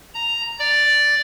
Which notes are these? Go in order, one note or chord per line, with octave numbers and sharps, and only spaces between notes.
A#5
D5